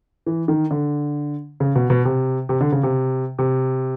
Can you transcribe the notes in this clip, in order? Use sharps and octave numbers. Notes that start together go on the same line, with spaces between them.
E3
D#3
D3
C#3
B2
B2
C3
C3
D3
C#3
C3
C3